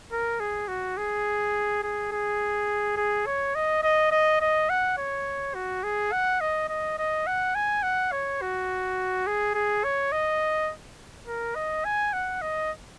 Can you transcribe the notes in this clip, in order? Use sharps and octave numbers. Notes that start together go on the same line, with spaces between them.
A#4
G#4
F#4
G#4
G#4
G#4
G#4
C#5
D#5
D#5
D#5
D#5
F#5
C#5
F#4
G#4
F#5
D#5
D#5
D#5
F#5
G#5
F#5
C#5
F#4
G#4
G#4
C#5
D#5
A#4
D#5
G#5
F#5
D#5